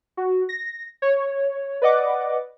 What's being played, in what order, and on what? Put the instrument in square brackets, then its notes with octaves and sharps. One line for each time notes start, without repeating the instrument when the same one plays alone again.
[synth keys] F#4
A#6
C#5
B4 D5 D#5 F#5 D6